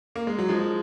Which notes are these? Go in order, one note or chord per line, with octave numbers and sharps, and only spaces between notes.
A#3
G#3
F#3
F3 G#3